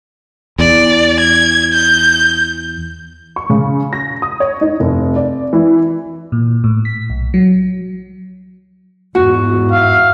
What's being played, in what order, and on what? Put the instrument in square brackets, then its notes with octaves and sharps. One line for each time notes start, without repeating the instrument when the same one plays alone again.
[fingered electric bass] E2 [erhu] D5
[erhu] G#6
G6
[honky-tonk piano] C#6
C#3
A#6
D#6
C#5
D#4
F1
D5
E3
[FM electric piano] A#2
A2
B6
B1
F#3
[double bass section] E2 G#2 [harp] F#4
[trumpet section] E5 F5